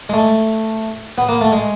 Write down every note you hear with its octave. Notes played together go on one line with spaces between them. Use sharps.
G#3
A3
B3
A#3
A3
G#3